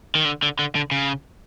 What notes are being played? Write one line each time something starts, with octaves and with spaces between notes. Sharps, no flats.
D#3
D3
D3
D3
D3
C#3